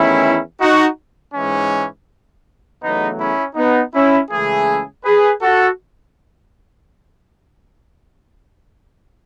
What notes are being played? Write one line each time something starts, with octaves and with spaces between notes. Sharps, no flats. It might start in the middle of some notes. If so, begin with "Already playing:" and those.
Already playing: E2 D#3 A3 C#4 E4
D#4 F#4
G#2 E3 G#3 C#4
E2 C#3 F#3 A3 B3 D#4
C#4 E4
B3 D#4
C#4 E4
C#2 C#3 E3 A3 E4 G#4
G#4 B4
F#4 A4